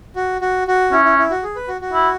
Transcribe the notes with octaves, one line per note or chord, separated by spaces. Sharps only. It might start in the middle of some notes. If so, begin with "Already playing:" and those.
F#4
F#4
F#4
C#4 E4
E4
E4
F#4
G#4
B4
F#4
F#4
E4